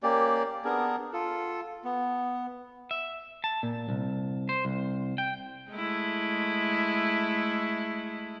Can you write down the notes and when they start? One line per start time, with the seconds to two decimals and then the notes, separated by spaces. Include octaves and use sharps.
0.03 A#3 C#4 G4 D5
0.65 B3 D4 G#4 A#4
1.13 F4 A4
1.84 B3
2.91 E5
3.44 A5
3.63 A#2
3.89 C2
4.49 C5
4.65 C2
5.18 G5
5.71 G#3 A3 E4